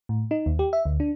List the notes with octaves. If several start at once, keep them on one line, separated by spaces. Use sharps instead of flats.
A2
D#4
D#2
G4
E5
D2
D4